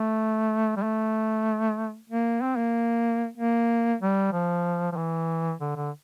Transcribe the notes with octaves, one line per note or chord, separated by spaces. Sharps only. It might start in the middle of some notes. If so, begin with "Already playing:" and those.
Already playing: A3
G3
A3
A#3
C4
A#3
A#3
G3
F3
F3
E3
D3
D3